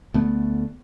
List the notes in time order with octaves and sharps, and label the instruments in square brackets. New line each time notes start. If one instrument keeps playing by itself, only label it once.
[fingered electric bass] D2 A3 B3